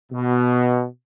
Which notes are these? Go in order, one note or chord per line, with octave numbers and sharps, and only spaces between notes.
B2